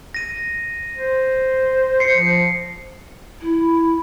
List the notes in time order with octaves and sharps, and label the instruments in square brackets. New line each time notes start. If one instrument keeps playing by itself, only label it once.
[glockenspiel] A#6 D#7
[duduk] C5
[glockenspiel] C7 C#7
[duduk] F3
[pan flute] E4